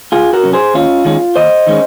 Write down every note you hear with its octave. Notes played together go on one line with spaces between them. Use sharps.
C#2 F4 G#4
F#4 A#4
C3 F#3 C#4
G#4 C5
D#2 C#4 F4
D#3 G#3 C#4
D#2 C5 D#5
D#3 G#3 C#4